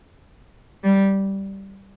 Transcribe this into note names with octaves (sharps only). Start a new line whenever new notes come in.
G3